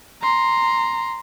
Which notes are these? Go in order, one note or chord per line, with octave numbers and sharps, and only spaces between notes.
A#5 C6